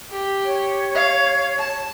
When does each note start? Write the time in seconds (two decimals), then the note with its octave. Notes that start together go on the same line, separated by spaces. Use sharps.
0.11 G4
0.44 C#5
0.95 F5
1.58 A5